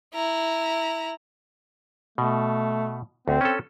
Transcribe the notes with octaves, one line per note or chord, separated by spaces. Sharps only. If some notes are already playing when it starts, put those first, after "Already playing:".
E4 A#5
B2 A3
D2 C4
C#4 A4